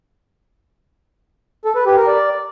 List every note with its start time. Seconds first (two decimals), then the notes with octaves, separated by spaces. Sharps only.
1.65 A4
1.76 B4
1.86 G4
1.97 A#4
2.07 D5